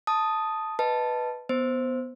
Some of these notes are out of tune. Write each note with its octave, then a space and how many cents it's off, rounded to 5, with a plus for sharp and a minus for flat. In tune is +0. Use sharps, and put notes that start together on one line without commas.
A5 +0 D#6 +0
B4 +0 D#5 +0 A5 +0
B3 +0 C5 +0